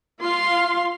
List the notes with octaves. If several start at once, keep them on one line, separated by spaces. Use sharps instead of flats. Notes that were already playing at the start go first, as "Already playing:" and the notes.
F4 F5 C6